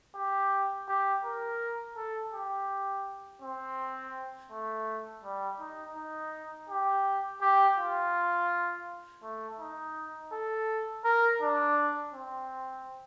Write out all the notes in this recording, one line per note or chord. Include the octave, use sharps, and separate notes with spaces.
G4
G4
A#4
A4
G4
C4
A3
G3
D#4
D#4
G4
G4
F4
A3
D#4
A4
A#4
D4
C4